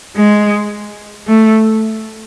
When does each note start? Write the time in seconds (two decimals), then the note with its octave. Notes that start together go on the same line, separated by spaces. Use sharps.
0.16 G#3
1.27 A3